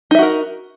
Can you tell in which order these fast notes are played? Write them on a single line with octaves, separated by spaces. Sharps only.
D#4 E5 F#4 A#4